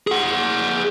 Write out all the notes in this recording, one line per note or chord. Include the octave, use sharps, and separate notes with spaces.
G#4 F#5